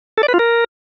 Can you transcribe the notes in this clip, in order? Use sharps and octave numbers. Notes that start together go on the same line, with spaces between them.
A4
D5
B4
F4
A#4